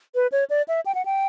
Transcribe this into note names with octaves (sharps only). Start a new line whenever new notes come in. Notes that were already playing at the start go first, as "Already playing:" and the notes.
B4
C#5
D5
E5
G5
F#5
G5